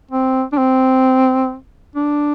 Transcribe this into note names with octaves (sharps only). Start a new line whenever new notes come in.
C4
D4
C4
D4